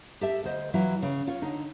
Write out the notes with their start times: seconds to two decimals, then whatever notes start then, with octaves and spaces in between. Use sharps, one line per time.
0.21 G4 A4 E5
0.44 D2 C5 D#5
0.74 E3 F#3 E4 F4
1.02 C#3
1.27 F4 C#5
1.42 D3 D#4